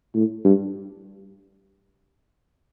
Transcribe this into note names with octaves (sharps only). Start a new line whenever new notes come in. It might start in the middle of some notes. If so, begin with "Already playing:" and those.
A2
G2